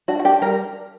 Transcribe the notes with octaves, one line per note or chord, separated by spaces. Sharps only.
D4 F#4
F#4
D4 G4
G3 A#4